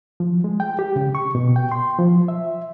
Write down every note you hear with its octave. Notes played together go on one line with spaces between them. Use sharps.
F3
G#3
G5
G4
C#3
C#6
B2
G5
C6
F3
E5